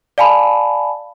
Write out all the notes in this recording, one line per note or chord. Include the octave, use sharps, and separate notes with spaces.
D5 F5 G#5 A5 B5